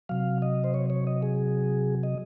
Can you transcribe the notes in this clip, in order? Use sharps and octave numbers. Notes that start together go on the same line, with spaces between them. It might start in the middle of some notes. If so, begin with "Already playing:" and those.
C3 F#3 F5
D#5
C5
C#5
C#5
D#5
G#4
D#5